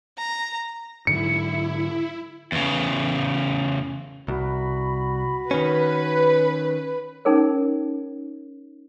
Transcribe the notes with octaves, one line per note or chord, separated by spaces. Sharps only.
A#5
G#2 D3 F#3 E4 C#7
E2 C#3
C2 F#4 B5
D#3 C#4 B4
C#4 D#4 G#4 A#4 C#5